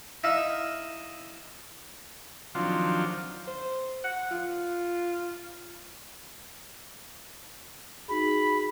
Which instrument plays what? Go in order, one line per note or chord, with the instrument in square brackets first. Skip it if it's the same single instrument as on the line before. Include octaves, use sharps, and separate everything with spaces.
[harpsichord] D#4 E4 E5 F5
[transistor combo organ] D#3 F3 F#3 C4 D4 F4
[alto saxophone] C5
F#5
F4
[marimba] D#4 F#4 G#4 [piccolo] B5